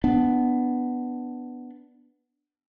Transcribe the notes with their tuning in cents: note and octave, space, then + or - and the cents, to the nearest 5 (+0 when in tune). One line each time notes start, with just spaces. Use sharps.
B3 +0 D4 +0